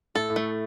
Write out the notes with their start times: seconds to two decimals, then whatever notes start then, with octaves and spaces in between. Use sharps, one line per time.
0.15 A2 A4
0.30 A2
0.36 A3